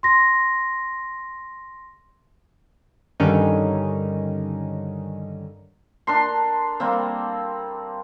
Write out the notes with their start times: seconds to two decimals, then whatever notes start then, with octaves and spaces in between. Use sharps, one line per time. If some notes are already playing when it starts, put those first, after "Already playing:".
0.03 C6 A#6
3.20 G2 D3 D#3 C#4 D#4
6.07 D4 A#4 C6
6.80 G3 A#3 C4